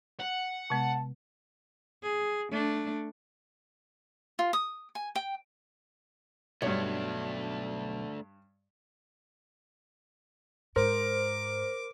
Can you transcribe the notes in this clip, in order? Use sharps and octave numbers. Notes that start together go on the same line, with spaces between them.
F#5
C3 G#3 B3 A5
G#4
A3 D4
F4
D#6
G#5
G5
B1 G2 A3 D4 C#5
G#2 A#4 C5 D6